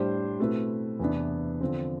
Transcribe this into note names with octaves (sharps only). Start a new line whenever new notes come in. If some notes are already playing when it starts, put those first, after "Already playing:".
Already playing: A2 G3 D4 G4 C5
B2 A3 C4 E4 B4
E2 C3 E3 B3 D4
D3 F3 C4